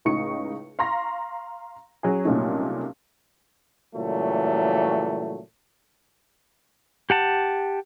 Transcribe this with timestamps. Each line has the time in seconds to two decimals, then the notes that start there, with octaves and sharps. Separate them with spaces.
0.05 C#2 A2 D#4 C#6 C#7
0.79 F5 A#5 C6 C#6 A#6
2.03 F#3 C#4 G#4
2.25 C2 F#2 A#2 F#3 A3 D#4
3.95 A#2 C#3 E3 F#3 G3 A3
7.10 G4 F#5 A5